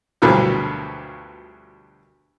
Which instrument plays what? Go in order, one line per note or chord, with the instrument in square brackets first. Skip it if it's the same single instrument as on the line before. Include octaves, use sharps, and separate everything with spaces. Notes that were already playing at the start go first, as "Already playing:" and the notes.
[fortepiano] D2 G2 B2 F3 F#3 A#3